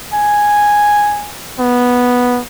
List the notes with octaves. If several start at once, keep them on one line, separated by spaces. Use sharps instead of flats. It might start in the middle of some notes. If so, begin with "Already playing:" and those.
G#5
B3